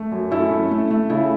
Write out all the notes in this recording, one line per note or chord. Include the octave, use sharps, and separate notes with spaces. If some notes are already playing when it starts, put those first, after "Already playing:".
Already playing: A3
F#2
C#4 E4 A4
A3
A3
A3
C#3 E4 A4